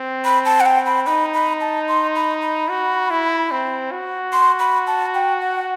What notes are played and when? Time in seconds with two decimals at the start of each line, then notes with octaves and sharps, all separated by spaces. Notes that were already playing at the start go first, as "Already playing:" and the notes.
Already playing: C4
0.25 B5
0.45 A5
0.60 F#5
0.66 G5
0.86 B5
1.06 D#4 B5
1.34 B5
1.61 A5
1.88 C6
2.15 B5
2.42 B5
2.70 F#4
3.10 E4
3.51 C4
3.91 F#4
4.33 C6
4.60 B5
4.87 A5
5.15 G5
5.41 F#5